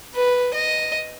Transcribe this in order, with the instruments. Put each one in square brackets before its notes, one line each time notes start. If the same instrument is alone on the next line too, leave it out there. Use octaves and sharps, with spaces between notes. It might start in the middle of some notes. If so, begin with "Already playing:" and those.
[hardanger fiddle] B4
D#5